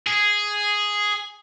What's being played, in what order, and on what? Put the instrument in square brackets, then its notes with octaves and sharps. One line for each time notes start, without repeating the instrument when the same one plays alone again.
[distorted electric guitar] G#4